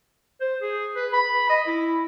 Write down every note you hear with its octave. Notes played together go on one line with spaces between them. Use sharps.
C5
G#4
B4
B5
D#5
E4